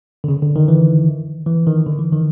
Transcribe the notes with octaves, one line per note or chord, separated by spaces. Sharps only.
D3
C#3
D3
D#3
E3
E3
D#3
D3
E3
D#3